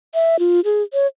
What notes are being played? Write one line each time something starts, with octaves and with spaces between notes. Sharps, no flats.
E5
F4
G#4
C#5